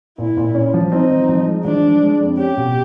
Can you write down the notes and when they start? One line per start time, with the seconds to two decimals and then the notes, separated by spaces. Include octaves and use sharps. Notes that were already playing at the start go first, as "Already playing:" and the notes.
0.18 A#2 E4
0.37 A#2
0.55 C#4
0.74 F3
0.92 C4 D#4
1.10 F3
1.29 F3
1.47 G#3
1.65 F3 D4
1.83 F3
2.02 G#3
2.21 F2
2.38 C#4 G4
2.57 B2